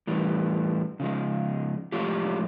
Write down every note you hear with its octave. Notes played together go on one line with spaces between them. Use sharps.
A2 E3 G3
C#3 F3 G#3
A2 F3 G#3 F4 G4